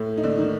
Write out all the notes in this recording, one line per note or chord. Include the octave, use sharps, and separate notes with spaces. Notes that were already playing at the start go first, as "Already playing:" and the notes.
Already playing: A2 A3
D#4
D3 D4
D#3 D#4